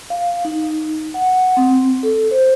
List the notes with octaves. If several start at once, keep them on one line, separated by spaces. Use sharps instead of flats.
F5
D#4
F#5
C4
A4
C5